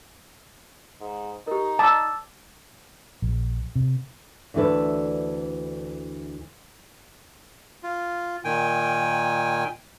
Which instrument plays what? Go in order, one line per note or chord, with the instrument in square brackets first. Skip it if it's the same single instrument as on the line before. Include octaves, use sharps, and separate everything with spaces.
[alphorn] G#2
[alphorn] D#4 [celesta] G4 A#4
[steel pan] A5 [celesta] D6 E6
[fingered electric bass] A#1
C3
[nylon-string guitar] D2 E3 D4 A4 B4
[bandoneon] F4
A#2 D#3 G5 G#5